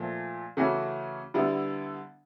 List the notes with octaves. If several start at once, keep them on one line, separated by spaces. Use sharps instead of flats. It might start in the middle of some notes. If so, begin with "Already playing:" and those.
Already playing: A#2 F3 A3
C#3 E3 A3 C#4 F#4
D3 G3 B3 E4